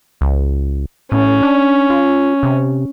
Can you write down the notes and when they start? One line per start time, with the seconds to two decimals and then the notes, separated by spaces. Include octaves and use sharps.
0.21 C#2
1.12 A2 C#4
1.42 D4
1.90 F4
2.43 C3